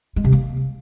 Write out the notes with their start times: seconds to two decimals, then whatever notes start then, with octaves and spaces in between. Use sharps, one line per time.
0.16 G#3
0.24 C3
0.32 A#3